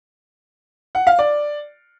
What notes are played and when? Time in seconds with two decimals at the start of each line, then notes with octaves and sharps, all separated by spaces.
0.95 F#5
1.07 F5
1.19 D5